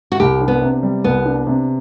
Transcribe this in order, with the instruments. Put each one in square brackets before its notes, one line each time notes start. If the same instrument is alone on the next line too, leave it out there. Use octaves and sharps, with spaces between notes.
[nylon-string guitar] F#4
[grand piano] C2 [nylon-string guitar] G4
[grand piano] D4
[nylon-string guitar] B3
[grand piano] C3
G3
[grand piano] C2 [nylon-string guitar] B3
[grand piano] D4
C3